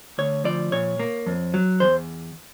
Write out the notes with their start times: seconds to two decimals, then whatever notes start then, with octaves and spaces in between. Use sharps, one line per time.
0.18 D2 C#5
0.44 F3 D5
0.72 A#2 C#5
0.99 A#3
1.26 F2
1.54 F#3
1.80 E2 C5